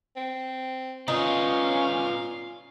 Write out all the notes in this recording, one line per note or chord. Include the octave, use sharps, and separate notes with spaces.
C4
C#4 D#4 F4 B4 D5 F5